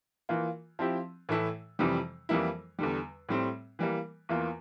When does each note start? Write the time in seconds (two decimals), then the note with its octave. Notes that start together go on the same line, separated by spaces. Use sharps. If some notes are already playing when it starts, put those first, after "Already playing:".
0.29 E3 A#3 F4
0.79 F3 C4 E4 G4
1.29 A2 E3 A3 E4
1.79 F2 C3 E3 G3
2.29 F2 E3 G3 A#3 E4
2.79 E2 D3 G3
3.29 A2 G3 C4
3.79 E3 G3 A#3
4.29 E2 E3 A#3 F4